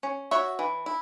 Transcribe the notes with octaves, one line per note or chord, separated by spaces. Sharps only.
C#4
F#4 C#5 E5
E3
E4